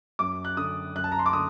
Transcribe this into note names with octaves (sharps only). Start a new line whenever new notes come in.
F#2 D6
F#6
D3 D#6
F#2 F#6
A5
A#5
C6
D6
D3 D#6